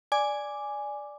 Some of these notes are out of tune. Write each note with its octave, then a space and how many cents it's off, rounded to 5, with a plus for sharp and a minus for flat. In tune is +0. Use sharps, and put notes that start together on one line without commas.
D5 +0 G#5 +0 D6 +0